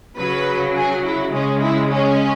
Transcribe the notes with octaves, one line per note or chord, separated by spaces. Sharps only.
C#3 F#3 B4
G#4
E4
C#3 G#3 C#4
E4
C#4